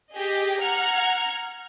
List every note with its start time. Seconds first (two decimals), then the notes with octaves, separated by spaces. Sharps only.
0.12 G4 G#4 D#5
0.61 F#5 A#5 F6 G#6